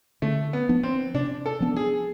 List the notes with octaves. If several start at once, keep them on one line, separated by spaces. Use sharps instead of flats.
D3 A3
B3
F3 B3 D4
C4
C3 D4
A4
F3 B3 D4
G#4